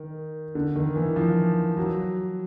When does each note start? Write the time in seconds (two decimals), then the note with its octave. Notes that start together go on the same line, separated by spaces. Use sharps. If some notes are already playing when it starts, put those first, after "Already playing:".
Already playing: D#3
0.55 D3
0.76 D#3
0.96 E3
1.16 F3
1.77 F#3